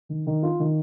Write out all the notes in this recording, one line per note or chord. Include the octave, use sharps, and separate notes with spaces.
D#3
D#3
F4
D#3